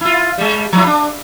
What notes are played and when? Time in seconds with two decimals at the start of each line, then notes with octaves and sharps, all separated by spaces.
0.01 E4 F4
0.38 G3 G#3
0.73 F3 F#3 E4
0.86 D4